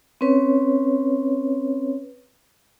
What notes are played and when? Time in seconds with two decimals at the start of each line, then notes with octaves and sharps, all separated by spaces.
0.21 C4 C#4 B4 C#5